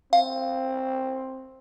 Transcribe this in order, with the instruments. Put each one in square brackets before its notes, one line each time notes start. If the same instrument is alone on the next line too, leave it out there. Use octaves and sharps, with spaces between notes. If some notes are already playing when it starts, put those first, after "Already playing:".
[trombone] C4 [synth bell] F5